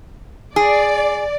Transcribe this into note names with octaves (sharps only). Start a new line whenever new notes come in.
G#4 D5